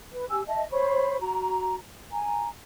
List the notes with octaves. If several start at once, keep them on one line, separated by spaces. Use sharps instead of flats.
B4
G4 G#5 E6
D#5 E5 A5
C5 C#5 B5 C#6
F#4 A#5
G#5 A#5